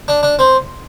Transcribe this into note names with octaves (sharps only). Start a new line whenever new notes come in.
D4
D4
C4